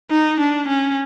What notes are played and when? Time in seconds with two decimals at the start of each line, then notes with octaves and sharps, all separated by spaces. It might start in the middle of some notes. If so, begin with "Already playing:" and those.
0.10 D#4
0.40 D4
0.68 C#4